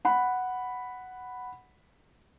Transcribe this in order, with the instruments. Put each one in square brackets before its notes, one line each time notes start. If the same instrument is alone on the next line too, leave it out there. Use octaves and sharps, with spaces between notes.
[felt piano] F#5 B5